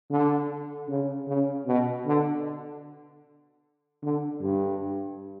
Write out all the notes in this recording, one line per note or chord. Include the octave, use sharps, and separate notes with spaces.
D3
C#3
C#3
B2
D3
D3
G2